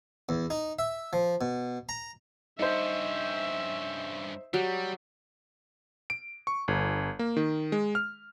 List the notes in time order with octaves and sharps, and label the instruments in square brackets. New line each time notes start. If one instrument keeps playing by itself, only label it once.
[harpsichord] E2
D#4
E5
F3
B2
A#5
[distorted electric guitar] G2 C#4 [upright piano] D#4 C5 [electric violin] E5
[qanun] F#3 G4 [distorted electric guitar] G3
[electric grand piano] D7
C#6
G1
A#3
D#3
G#3
F6